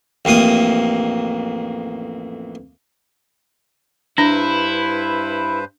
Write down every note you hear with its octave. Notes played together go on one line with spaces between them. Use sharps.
A1 F2 A#3 D#6
G2 D4 E4 B4 C5